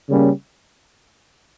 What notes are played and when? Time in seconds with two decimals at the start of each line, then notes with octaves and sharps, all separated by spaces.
0.09 C#3 G3 A#3 C#4